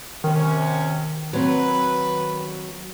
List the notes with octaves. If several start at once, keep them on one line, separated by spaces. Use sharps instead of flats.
C3 D#3 C#4
F#3 C4 B4